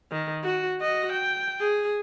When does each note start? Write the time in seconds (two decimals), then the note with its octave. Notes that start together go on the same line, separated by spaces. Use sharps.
0.12 D#3
0.44 F#4
0.80 F#4 D#5
1.13 G5
1.61 G#4